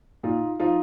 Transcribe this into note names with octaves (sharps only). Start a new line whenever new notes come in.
A#2 D#4 F4
F3 D#4 F4